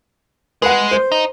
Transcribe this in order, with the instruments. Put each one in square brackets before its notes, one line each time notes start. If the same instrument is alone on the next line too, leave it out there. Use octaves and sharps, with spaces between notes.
[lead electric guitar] G#3 [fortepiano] B4 F#5
[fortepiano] C5
[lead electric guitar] D#4